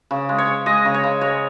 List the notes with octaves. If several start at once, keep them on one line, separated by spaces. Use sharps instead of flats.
C#3
G#3
C#5
C#3
G#3 D#5
C#3
C#5
C#3
G#3 C#5